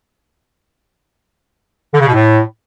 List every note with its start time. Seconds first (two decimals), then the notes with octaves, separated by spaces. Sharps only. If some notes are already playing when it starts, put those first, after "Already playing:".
1.94 D3
2.01 C#3
2.07 B2
2.13 A2